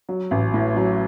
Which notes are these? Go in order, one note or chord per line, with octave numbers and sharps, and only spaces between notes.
F#3
A1
A2
F#3